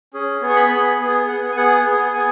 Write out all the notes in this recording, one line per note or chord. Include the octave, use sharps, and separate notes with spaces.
C#4 G#4
B3 G#4
C#6
B5
B3 G#4
B3 G#4
B3 G#4 F#5
G#5
B3 G#4 F#5
B3 G#4
B3 G#4 G#5